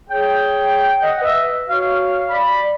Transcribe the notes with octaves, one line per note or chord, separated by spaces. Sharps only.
G#4 C#5 G5
D#5 F#5
B4 D#5 E5
F#4 C#5 F5
D5 B5